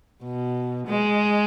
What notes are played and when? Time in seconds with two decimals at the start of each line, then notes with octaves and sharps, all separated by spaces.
0.23 B2
0.87 G#3